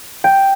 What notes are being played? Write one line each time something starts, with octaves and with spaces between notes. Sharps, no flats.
G5